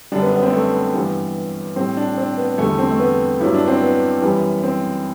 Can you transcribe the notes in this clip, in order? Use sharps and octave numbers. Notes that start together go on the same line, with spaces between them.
F#2 D3 G3 D4
B3
B3
C4
B3
A3
B3
G2 E3 G3 B3
A2 G3 C4
D4
C4
B3
E2 D3 G3 A3
C4
A3
B3
G2 F#3 E4
D4
C4
B3
F#2 E3 G3
C4